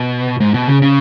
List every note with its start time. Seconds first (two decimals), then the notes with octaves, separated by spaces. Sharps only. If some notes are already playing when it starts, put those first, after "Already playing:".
Already playing: B2
0.40 G#2
0.54 B2
0.68 C#3
0.82 C#3